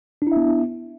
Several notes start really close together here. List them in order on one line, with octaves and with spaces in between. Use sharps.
D4 E4 E5 B3